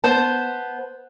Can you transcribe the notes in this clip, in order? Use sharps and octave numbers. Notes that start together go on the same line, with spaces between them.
B3 C5 A5